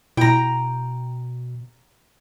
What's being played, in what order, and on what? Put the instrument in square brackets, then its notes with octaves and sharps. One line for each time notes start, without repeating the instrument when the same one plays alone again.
[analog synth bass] B2 [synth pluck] E4 [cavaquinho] G5 A#5